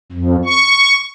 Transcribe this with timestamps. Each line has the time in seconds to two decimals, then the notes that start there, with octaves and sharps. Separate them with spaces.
0.12 F2
0.45 C#6